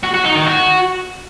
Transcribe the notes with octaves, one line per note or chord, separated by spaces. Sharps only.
F#4
F#4
D#4
D#3
F#4